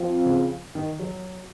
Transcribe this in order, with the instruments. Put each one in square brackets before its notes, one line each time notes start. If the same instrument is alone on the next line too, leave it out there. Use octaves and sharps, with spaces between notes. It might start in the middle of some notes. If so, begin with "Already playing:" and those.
Already playing: [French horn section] F3 C4 F4
[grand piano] C#3
D#3
F#3